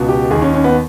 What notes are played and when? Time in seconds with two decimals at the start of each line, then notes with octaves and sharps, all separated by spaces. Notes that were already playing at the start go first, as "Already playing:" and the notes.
Already playing: C#2 B2
0.09 G4
0.31 D#2 D#3 G#4
0.42 C#4
0.54 C#4
0.64 B3